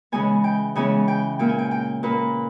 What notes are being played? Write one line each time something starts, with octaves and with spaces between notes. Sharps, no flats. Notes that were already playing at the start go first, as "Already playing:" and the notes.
C#3 E3 G#3 B3 G#5
G5
C#3 E3 G#3 B3 G#5
G5
A#2 A#3 G5
G#5
G5
G5
A#2 A#3 B4